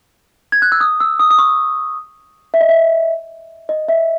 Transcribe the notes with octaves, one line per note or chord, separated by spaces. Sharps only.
G#6
F#6
E6
D#6
E6
D#6
D#6
C#6
E5
D#5
E5
D#5
E5